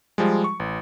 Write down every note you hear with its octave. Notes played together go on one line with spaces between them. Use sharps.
F3 G3 G#3
C#6
A1